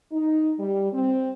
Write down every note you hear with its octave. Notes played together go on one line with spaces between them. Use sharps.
D#4
G3
C4